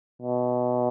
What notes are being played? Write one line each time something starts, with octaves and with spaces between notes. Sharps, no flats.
B2